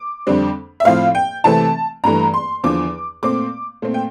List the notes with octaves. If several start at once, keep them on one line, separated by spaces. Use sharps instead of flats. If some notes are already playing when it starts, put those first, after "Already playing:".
Already playing: D6
F2 D3 G3 C4
E5
A2 F3 C4 F5
G5
C3 E3 A3 C4 A5
G2 E3 A3 A#5
C6
E2 D3 F3 D6
A#2 A3 C4 D6
A#2 A3 C4
G5